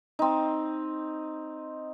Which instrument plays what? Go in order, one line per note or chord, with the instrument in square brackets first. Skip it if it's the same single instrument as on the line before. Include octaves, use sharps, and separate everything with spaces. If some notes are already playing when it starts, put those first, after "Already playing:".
[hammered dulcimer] C4 D#4